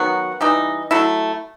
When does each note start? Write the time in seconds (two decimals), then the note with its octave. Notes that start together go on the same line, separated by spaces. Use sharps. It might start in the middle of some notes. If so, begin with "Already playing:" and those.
Already playing: D#3 F#3 B3 F#4
0.41 E3 G3 D#4
0.91 F#3 A3 E4